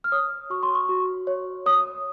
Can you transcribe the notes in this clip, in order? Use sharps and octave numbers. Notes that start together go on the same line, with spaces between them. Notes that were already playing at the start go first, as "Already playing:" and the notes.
F6
C#5 D#6
F#4 C#6
C6
C#6
F#4
C#5
C#5 D#6